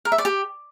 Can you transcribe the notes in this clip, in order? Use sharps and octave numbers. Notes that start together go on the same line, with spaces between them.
A#4
E5
D5
G4